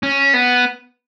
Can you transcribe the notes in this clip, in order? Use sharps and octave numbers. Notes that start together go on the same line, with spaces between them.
C#4
B3